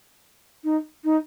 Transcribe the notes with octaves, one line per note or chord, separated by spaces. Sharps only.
D#4
D#4